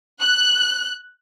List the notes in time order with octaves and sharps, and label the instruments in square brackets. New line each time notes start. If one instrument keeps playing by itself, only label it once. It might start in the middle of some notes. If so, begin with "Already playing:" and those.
[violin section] F#6